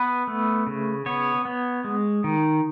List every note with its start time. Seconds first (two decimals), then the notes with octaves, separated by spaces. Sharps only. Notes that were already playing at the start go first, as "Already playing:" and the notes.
Already playing: B3 B4
0.27 A3
0.67 C#3
1.06 B3 C#5
1.45 B3
1.84 G#3
2.24 D#3